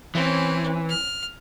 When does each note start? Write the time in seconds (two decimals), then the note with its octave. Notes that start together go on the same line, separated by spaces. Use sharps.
0.15 E3 C4 C#4
0.89 F6